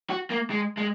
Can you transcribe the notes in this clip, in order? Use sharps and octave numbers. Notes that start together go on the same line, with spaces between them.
F#4
A#3
G#3
G#3